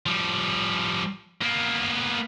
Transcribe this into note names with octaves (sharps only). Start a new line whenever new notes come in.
F3 G3
A#3 B3